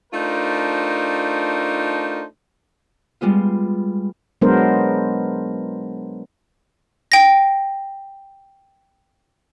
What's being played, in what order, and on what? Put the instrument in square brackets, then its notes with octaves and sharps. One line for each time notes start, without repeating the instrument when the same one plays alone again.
[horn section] A3 D4 D#4 F4 A#4 C5
[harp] G3 G#3 B3 F4
[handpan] F#3 G#3 B3 D4 A#4 C5
[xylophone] G5 A#6